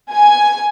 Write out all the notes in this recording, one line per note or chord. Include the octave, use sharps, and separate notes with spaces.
G#5